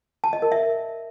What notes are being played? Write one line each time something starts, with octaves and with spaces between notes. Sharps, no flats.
A5
D#5
A#4
E5